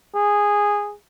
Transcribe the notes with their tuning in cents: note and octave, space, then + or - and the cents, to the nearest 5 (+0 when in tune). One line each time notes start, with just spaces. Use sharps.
G#4 -10